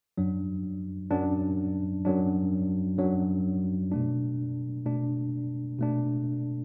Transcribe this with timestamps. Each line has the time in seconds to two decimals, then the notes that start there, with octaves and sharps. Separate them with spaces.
0.18 F#2 F#3 D4
1.11 F#2 F#3 D4
2.05 F#2 F#3 D4
2.98 F#2 F#3 D4
3.92 B2 A3 D4
4.85 B2 A3 D4
5.79 B2 A3 D4